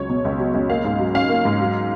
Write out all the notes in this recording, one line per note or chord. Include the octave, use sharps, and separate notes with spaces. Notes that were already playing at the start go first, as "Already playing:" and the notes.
Already playing: C#2 F#3 C#5
B2
C#2
F#3
C#2
A#3 F5
G#2
F#3
C#4 F5
A#3
G#2
F#3